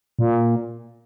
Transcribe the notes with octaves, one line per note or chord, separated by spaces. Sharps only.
A#2